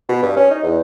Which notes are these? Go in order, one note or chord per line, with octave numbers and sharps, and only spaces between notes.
B2
G2
C#4
D#4
E2